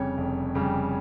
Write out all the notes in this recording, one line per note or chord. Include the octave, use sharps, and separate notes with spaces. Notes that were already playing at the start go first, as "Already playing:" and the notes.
Already playing: F1 F2 C#3 G3 C#5
F1
F2 C#3 G3